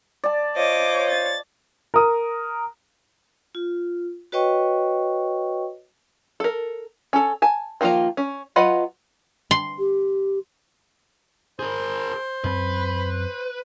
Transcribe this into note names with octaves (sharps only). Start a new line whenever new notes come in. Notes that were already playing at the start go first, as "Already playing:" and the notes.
D5 A5
F4 C5 C#5 D#5 D6
A6
A#4 D#6
F4
F#4 B4 C#5 D#5 G5 C#6
A4 A#4
C#4 A4
G#5 A5
D#3 F3 A#3 F4 A#5
C#4
F#3 F4 B4 D#5 F#5
C6
G4
G#4 A#4 C5
F#2 C4 B4